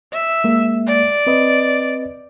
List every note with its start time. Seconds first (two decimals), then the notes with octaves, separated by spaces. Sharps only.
0.13 E5
0.44 G#3 A#3
0.87 D5
1.27 C4 B4 D#5